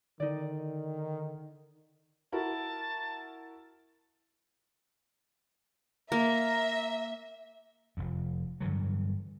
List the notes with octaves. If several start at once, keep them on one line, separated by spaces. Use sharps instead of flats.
D3 D#3 D#4 D5
E4 F#4 A#4 A5
A#3 E5 A#5
F1 F2
G2 D3 E3 F#3